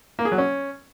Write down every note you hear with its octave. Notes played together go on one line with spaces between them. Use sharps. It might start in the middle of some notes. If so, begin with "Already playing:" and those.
A#3
G#4
F#3
C#4